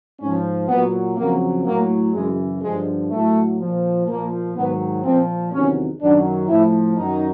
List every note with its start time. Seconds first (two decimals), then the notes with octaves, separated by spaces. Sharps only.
0.20 G#2 F3 C#4
0.68 A#2 F#3 B3
1.16 F2 C#3 F#3 A#3
1.65 A2 F#3 A#3
2.14 F#2 C#3 E3 G#3
2.62 G2 D3 F3 G#3
3.11 A2 F#3 A3
3.59 A#2 F3
4.08 A#2 F3 A#3
4.55 G#2 D#3 F#3 B3
5.04 A#2 F3 C4
5.53 E2 C3 D#3 F#3 C#4
6.01 F#2 D#3 F#3 D4
6.49 A2 F3 E4
6.97 F#2 D#3 F#3 D#4